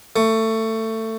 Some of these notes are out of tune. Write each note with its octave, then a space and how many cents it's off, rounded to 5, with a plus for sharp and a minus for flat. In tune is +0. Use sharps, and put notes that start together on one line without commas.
A3 +20